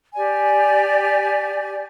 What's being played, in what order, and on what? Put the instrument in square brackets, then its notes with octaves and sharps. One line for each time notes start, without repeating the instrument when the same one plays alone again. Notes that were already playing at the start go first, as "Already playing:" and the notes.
[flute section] G4 D5 G#5